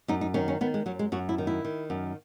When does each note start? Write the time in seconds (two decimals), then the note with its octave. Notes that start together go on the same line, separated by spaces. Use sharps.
0.08 F#2 D#4
0.21 D#4
0.34 D#3 C#4
0.48 C#4
0.61 D#3 B3
0.74 G#3
0.86 F#2 F#3
0.99 G#3
1.12 F#2 F#4
1.29 E4
1.38 D#3
1.47 E4
1.64 D#3
1.90 F#2